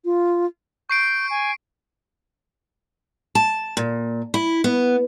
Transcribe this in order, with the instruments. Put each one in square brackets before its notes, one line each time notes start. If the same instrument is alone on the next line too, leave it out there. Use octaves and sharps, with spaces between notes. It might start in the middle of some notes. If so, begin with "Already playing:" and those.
[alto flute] F4
[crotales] C#6 C7 D7 [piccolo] G6
[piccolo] G#5
[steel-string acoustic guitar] A5
A#2
E4
B3